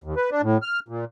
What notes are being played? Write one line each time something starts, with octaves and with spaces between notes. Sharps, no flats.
D#2
B4
D4
A2
F6
A#2